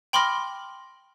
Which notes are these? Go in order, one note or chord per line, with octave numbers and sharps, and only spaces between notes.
G5 B5 C6 D6 F6 A#6